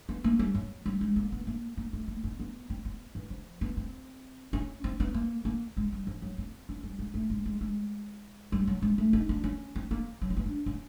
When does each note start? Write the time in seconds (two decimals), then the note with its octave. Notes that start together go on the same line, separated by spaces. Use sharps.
0.09 B3
0.24 A#3
0.39 G3
0.55 F#3
0.86 G3
1.01 G#3
1.16 A#3
1.32 B3
1.47 A#3
1.77 A#3
1.93 A3
2.08 A#3
2.24 B3
2.40 B3
2.70 C4
2.85 B3
3.15 E3
3.30 F3
3.61 B3
3.77 C4
4.53 C#4
4.84 C4
5.00 B3
5.14 A#3
5.45 A#3
5.77 G#3
5.92 G3
6.07 F3
6.22 F#3
6.38 C4
6.69 C#4
6.83 G3
6.99 G#3
7.14 A3
7.30 G#3
7.46 G#3
7.61 G#3
8.52 G3
8.67 F#3
8.82 G#3
8.98 A3
9.13 D#4
9.29 D4
9.44 C#4
9.76 C4
9.91 A#3
10.22 F#3
10.30 C4
10.37 B3
10.46 D4
10.66 C#4